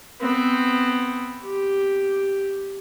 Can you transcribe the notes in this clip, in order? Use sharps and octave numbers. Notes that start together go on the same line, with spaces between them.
B3 C4
G4